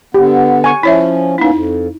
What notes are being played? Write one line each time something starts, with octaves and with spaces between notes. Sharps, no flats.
D3 B3 G4
G#5 C#6
F3 C#4 E4 C#5 E5
A#3 B3 C#4 D#4 E4
F2